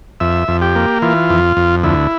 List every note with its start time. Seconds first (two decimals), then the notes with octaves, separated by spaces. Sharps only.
0.20 F2 E5
0.48 F2
0.62 G4
0.76 A#3
1.02 E3 F4
1.30 F2
1.57 F2
1.83 D2 E4